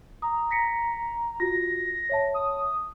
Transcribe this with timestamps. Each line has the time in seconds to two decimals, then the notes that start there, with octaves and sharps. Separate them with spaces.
0.22 A#5 D#6
0.51 A#6 B6 C#7
1.40 F4 F#4 A#6
2.10 C#5 E5 A5
2.34 D#6